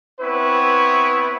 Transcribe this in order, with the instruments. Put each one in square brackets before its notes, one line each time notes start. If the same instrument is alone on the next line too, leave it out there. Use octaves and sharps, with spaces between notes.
[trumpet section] B3 C4 E4 B4 C#5